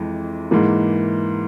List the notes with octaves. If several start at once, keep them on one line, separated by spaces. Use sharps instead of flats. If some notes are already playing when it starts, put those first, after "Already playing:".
Already playing: F2 E3 G#3
G#2 E3 A#3